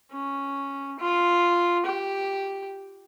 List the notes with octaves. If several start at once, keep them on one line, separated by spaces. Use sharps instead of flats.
C#4
F4
G4